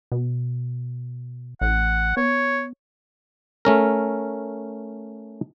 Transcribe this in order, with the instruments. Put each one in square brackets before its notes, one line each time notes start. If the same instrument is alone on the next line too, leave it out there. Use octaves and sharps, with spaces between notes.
[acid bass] B2
[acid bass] A1 [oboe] F#5
[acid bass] B3 [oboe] C#5
[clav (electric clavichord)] A3 C#4 A#4